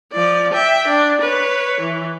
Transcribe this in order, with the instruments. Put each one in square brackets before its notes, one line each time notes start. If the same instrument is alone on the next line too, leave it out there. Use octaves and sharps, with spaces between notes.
[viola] F3 D5
E5 G5
D4
B4 C#5
E3